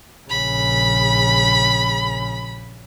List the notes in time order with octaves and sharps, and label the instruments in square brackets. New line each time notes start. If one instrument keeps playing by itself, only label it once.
[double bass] A#1 C#3 [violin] B5